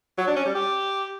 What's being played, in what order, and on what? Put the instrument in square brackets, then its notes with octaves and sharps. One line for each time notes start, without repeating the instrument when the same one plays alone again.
[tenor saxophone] F#3
D4
C#4
G3
G4